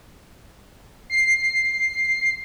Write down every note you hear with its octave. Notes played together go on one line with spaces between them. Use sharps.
C7